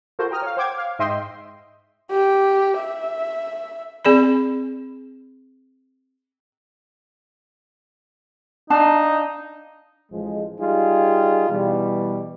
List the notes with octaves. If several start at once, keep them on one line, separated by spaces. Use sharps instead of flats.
F4 F#4 A4 A#4 C5
G5 A#5 D#6 F6
C#5 F5
C5 F#5 G5 D6 G#6
F5
G#2 D#5 E5 G5 C6
G4
E5
C4 G#4 D5 B5
D4 D#4 F5 A5
A1 F3 G#3
G3 D#4 F4 G4 G#4
B2 E3 G3